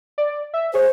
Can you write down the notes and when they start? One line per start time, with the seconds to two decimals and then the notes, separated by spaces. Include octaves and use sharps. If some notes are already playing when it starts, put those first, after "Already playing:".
0.18 D5
0.54 E5
0.74 G#4 C5 C#5